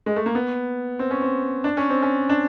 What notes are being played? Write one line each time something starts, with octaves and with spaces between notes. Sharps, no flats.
G#3
A3
A#3
B3
C4
C#4
C4
D4
C#4
C4
C#4
D4